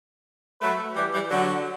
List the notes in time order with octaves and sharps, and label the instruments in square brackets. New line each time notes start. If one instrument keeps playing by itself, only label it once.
[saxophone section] F#3 A3 [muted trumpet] B4
[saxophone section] E3 G3 [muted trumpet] G4
[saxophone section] E3 G3
[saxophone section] D3 F#3 [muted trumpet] F#4